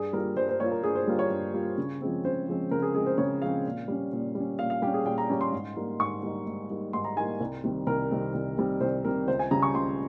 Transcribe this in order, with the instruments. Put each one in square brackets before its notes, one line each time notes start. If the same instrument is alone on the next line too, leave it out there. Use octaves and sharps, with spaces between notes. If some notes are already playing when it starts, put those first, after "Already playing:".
Already playing: [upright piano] G2 G#4
G3 A#3 F4 A#4
G2 C5
C5
G3 A#3 F4 C#5
A#4
G2 G#4
C5
G3 A#3 F4
C#5
G2
G3 A#3 F4
C#3
F3 G#3 C4
C#3 C5
F3 G#3 C4
C#3 A#4
G#4
F3 G#3 C4 G#4
C5
C#3 C#5
F3 G#3 C4 F5
A#2
G3 C#4
A#2
G3 C#4
A#2 F5
F5
G3 C#4 G4
G#4
A#2 G5
A#5
G3 C#4
C6
G#2
G3 A#3 D#4
G#2 C#6
G3 A#3 D#4
G#2
G3 A#3 D#4
G#2 C6
A#5
G3 A#3 D#4 G#5
C2
C3 D#3 G3 C4
C2 A#4
C3 D#3 G3 C4
C2
C3 D#3 G3 C4
C2 C5
C3 D#3 G3 C4 A#4
C#2 C5
G#5
C#3 G3 C#4 A#5
C#6
C#2 C6